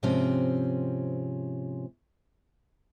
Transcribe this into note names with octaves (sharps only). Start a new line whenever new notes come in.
G#2 C3 F3 C4 C#4